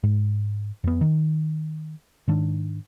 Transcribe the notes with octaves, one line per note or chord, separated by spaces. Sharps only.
G#2
F2 B3
D#3
G#2 D#3 D4